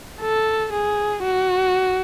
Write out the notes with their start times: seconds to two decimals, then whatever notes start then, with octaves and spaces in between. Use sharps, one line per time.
0.21 A4
0.73 G#4
1.24 F#4